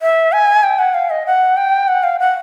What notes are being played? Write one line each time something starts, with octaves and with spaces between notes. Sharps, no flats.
E5
G#5
G5
F#5
F5
D#5
F#5
G5
F#5
F5
F#5